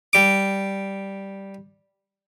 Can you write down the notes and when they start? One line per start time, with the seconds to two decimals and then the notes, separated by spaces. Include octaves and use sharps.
0.13 G3 D6